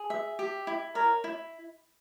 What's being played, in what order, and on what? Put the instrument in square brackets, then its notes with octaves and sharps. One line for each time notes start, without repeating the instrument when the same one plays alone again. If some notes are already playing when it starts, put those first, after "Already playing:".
Already playing: [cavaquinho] G#4
E5
G4
E4
[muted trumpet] A#4 [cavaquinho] C#5
[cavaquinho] E4